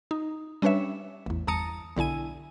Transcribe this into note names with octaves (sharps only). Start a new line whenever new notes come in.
D#4
G3 C#4 D4 B4 C#5 E5
A1 E2
G1 E2 A5 A#5 D#6 C#7
B1 D3 E4 G#5 D#7